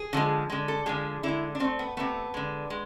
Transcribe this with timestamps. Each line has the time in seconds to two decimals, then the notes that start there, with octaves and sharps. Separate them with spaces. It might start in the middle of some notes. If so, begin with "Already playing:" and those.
Already playing: G#4
0.13 D3 F3 G#3
0.50 D3 G#3
0.68 A4
0.86 D3 F3 G#3 G#4
1.23 D3 G#3 E4
1.55 D4
1.60 B2 A3 C4
1.79 B3
1.97 C3 E3 A3 B3
2.34 D3 G#3
2.70 G#3